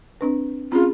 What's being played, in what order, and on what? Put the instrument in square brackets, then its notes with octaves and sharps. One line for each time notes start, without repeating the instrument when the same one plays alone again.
[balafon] C4 D4 B4
[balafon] C4 C#4 G#4 [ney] F4